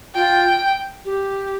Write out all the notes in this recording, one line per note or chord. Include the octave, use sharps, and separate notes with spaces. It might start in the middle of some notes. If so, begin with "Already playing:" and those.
F4 G5
G4